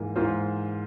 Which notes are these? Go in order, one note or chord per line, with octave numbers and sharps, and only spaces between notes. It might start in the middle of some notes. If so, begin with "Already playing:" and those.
Already playing: G#2 E3 A#3 F4
G#2 E3 A#3 F4 C5